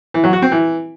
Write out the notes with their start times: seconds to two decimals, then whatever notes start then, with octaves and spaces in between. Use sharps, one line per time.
0.14 E3
0.24 F#3
0.33 F#4
0.42 C4
0.52 E3